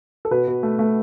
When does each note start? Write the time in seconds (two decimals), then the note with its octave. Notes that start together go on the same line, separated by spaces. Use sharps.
0.25 A4
0.31 B2 B4
0.48 B2
0.63 A3
0.79 A3